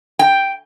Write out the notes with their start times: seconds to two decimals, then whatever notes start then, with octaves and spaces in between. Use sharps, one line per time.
0.19 G5